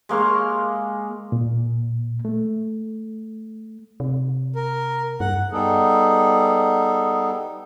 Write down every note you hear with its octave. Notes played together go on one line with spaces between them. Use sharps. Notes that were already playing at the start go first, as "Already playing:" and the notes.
G#3 A#3 F5 C#6
A#2
A3
C3
A#4
G2 F#5
G3 B3 D#4 G#4 A4